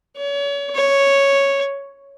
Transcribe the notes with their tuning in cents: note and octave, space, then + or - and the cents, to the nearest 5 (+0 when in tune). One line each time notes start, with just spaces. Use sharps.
C#5 +35
C#5 +0